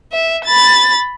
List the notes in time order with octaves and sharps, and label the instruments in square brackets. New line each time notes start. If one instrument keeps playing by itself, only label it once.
[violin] E5
B5 A6